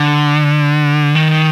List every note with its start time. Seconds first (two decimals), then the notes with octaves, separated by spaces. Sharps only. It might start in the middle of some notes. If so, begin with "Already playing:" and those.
Already playing: D3
1.15 D#3